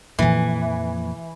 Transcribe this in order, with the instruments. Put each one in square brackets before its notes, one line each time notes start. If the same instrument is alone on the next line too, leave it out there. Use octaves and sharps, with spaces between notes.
[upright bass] F2 A#2 [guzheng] E3